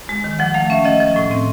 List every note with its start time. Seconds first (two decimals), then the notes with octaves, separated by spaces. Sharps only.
0.09 G#3
0.24 D#3
0.39 F3 F#5
0.54 A3 F5
0.70 C#4 E5
0.85 F3 D#5
1.01 F3
1.16 A2
1.31 C4